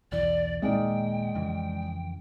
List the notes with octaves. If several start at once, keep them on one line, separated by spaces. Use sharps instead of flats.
B1 E2 E3 D5
D#1 A#2 G#3 D#4 D5 G5
F2 C#3 E3